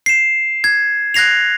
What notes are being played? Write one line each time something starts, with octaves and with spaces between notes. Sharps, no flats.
C7 E7
G#6
F#6 G#6 A#6 C7 F7